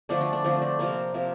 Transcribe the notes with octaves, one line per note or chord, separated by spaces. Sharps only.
D3 F3 A3 D4
D4
D4
D3 F3 A3 C4
D4
C3 F3 A#3 C4
C3 F3 A#3